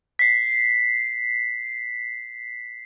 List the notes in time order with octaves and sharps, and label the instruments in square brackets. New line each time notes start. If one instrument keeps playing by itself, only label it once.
[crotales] B6 C7